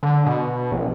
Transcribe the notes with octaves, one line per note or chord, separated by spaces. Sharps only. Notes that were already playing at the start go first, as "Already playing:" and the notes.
D3
B2
A#1